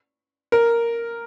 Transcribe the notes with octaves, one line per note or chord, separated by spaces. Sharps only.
A#4